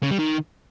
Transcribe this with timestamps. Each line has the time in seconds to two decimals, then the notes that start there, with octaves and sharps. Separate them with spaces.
0.03 C#3
0.11 G3
0.19 D#3